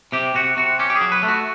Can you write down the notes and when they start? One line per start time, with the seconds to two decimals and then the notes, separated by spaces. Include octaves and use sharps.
0.12 C3 G4
0.35 C3 F#4
0.57 C3 F#4
0.79 C#4 G4
0.90 G4
0.96 G#4
1.01 F#3
1.12 B4
1.23 A3
1.28 F#4